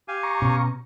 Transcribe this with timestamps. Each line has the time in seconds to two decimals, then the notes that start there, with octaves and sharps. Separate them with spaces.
0.08 G4 F5 G#5
0.23 A#5 C#6
0.42 B2 C#4